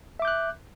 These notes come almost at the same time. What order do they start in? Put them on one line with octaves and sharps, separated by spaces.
E5 D6 G6 F#6